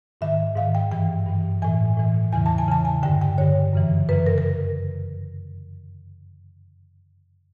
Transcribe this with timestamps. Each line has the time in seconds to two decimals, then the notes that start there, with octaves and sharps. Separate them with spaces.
0.21 G#2 D#3 E5
0.56 G#2 D#3 F5
0.75 G5
0.91 G2 E3 G5
1.26 G2 E3
1.62 A2 E3 G#5
1.97 A2 E3
2.32 E2 C#3 E3 G#5
2.46 A5
2.58 G#5
2.68 E2 C#3 E3 A5
2.85 G#5
3.03 G2 D3 G5
3.22 G5
3.38 G2 D3 C#5
3.73 F#2 C#3 E3
4.09 F#2 C#3 E3 B4
4.27 A#4
4.38 A#4